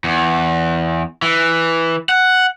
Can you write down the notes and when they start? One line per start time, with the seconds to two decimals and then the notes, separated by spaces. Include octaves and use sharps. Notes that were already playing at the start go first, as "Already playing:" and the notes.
0.04 E2
1.22 E3
2.09 F#5